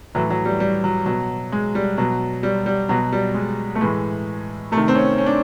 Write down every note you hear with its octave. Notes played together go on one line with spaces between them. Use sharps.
A2 E3 F#3
F#3
G3
G3
F#3
B2 F#3
G#3
G3
B2 F#3
G3
G3
B2 F#3
G3
G#3
A3
A2 E3 G#3
C3 A3
D#3
C4
C#4
C#4
D4